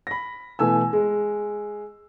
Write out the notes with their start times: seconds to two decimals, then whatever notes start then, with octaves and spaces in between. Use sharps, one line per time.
0.07 B5 A#6
0.59 B2 E3 A3 G#5 E6
0.93 G#3